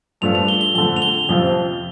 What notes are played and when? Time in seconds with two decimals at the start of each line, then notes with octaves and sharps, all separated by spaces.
0.21 G2 F3 A3 D4 F4 F7
0.35 F7
0.48 G7
0.61 G7
0.74 F2 D3 A3 G7
0.96 F7
1.02 G7
1.29 F2 C3 F3 C4 F4